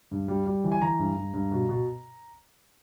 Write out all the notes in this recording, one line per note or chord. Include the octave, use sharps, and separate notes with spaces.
G2
G3
G3
E3
G#5
E3 A#5
G2
G2
G2
B2
B2